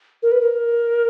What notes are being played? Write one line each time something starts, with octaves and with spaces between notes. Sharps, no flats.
A#4
B4
A#4